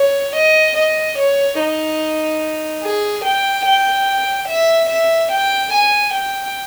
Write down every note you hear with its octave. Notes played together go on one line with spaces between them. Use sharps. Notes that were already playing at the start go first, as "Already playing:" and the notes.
Already playing: C#5
D#5
D#5
C#5
D#4
G#4
G5
G5
E5
E5
G5
G#5
G5